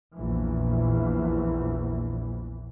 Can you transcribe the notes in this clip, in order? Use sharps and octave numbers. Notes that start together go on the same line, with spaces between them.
A#1 E2 E3